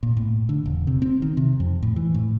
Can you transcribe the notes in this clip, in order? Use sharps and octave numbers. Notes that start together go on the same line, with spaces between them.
A#2
A2
D3
E1
C3
C4
D#3
C3
F2
A2
E3
A2